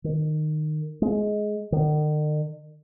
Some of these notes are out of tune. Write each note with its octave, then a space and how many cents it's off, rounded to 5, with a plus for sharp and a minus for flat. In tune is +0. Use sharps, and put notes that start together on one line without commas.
D#3 -20
G#3 +15
D#3 -45